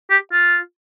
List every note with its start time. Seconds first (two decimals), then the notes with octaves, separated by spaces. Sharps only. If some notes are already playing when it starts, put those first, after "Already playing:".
0.10 G4
0.32 F4